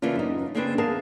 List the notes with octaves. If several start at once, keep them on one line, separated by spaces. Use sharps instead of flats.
C#3 E3 A#3 D4 F4
F#2 D#4
C#3 A#3 C4 D4 G#4 B4
E2 G#4 A#4 F5 A5